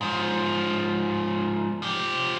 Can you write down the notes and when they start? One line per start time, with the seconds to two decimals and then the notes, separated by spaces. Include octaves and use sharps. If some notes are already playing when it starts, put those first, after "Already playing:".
0.01 G#2 F3
1.82 F3 G4